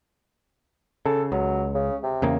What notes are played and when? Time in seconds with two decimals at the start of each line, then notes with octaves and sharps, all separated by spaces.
1.06 C#3 A4
1.32 C#2 F#3
1.75 C#3
2.03 C3
2.22 E2 C#3 A#3